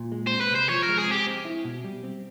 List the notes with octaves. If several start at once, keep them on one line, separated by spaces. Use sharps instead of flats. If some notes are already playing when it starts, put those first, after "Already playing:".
Already playing: A#2
G#3
C4 C5
B4
C3 C5
F3 C#5
A#4
G#3
G#4
C4 G4
C4
E4
B2
G3
C4